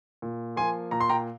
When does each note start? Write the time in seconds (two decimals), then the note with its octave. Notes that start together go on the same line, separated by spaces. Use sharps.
0.22 A#2
0.56 F3 A#3 G#5 C6
0.91 A#2 A#5
1.00 C6
1.10 G5 A#5